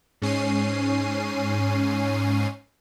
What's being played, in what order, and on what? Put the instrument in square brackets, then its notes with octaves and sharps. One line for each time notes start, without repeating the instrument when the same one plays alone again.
[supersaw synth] G#2 C#4 C7 D#7